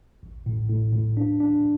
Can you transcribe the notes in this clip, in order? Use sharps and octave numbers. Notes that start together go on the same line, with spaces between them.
A1
A2
A2
A2
D4
D4